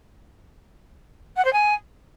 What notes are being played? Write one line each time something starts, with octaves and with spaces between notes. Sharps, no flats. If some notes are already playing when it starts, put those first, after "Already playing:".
F#5
C5
G#5